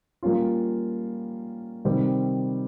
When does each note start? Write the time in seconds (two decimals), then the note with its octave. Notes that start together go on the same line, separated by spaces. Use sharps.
0.23 G3 A#3 C#4 F4
1.85 C3 D#3 G3 C4